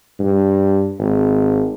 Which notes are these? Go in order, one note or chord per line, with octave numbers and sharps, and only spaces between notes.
G2
G#1